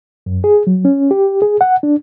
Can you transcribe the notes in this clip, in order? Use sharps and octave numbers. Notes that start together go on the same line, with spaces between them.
F#2
G#4
F#3
C#4
G4
G#4
F#5
D4